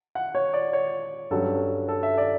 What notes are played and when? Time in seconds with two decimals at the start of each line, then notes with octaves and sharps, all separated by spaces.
0.15 F#5
0.35 C#5
0.53 D5
0.73 C#5
1.31 G2 F#3 C#4 A4
1.89 A4
2.03 E5
2.18 D5